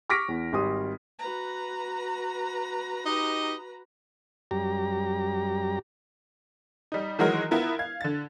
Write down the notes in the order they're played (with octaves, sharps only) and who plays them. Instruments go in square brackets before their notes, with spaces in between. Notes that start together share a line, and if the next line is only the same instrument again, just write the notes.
[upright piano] C#6 D6 F6 A#6 B6 D7
E2
G#1 G3 C6 D#6
[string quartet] F#4 B4 A#5
[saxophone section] D#4 G4 D#5
[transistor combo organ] F#2 G3 G4 A#5
[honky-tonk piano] G3 D#4
D#3 E3 F#3 G#3 F#4 A#4
B3 E4 F4 A#4
F5 G#6
D3 A6